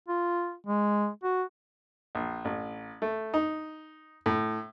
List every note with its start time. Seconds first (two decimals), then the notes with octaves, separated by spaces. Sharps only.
0.08 F4
0.67 G#3
1.24 F#4
2.15 A#1
2.45 A1
3.02 A3
3.34 D#4
4.26 A2